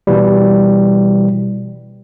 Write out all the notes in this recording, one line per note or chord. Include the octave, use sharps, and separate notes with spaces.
B2 E3 G3